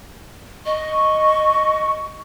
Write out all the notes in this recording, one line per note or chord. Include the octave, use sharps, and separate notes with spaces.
D#5 C#6